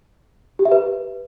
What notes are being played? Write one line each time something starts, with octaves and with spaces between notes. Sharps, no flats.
G4
E5
B4